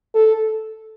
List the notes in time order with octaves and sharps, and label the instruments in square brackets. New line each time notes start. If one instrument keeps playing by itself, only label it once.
[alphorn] A4